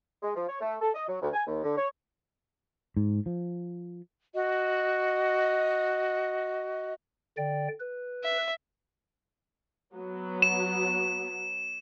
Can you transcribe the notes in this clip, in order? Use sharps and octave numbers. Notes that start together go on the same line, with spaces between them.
G#3
F3
C#5
A3
A4
D#5
F#3
D2
G#5
D#2
D3
C#5
G#2
F3
F#4 D#5
D3 D5 G5
B4
E5
F#3 B3
E7